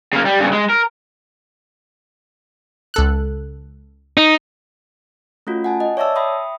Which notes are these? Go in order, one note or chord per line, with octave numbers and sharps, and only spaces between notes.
C#3 A#3
G3
G2 C#3
G#3
A#4
C#2 A4 F#6
D#4
A3 C#4 F4 F#4
F#5 G#5 A5
D#5
C#5 D5 E5 A5 E6
E5 G5 B5 C6 D#6